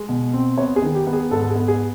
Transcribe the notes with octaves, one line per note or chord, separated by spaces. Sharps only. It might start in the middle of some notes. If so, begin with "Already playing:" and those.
Already playing: G#3
B2
C4
B3 C#5
G#4
D#3
G4
B3
G#4
G#2 A4
A4
G#4
B3
G#4